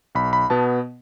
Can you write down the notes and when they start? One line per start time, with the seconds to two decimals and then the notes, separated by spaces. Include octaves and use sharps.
0.15 B1 B5
0.33 B5
0.50 B2 B3 A5